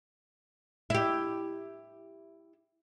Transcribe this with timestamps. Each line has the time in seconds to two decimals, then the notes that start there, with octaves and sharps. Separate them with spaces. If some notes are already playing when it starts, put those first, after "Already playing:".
0.90 E4 G4